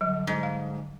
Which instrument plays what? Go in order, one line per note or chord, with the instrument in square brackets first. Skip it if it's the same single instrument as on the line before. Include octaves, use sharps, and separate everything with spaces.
[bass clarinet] D3 [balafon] F#3 G3
[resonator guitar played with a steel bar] G#2
[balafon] F5